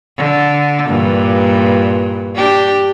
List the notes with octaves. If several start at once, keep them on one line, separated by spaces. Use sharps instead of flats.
D3
G2 A#2 E3
D4 G4